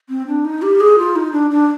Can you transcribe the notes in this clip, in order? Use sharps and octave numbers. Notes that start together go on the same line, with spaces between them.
C4
D4
D#4
G4
G#4
F4
D#4
D4
D4